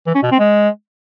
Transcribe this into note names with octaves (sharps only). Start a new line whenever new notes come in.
E3
C#4
B2
C4
G#3